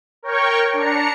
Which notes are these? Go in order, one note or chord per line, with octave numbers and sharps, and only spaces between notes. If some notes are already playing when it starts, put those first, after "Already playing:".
A#4 C#5 G5 C#6
D4 A#5 C#7